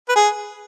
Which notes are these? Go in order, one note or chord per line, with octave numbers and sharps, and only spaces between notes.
B4
G#4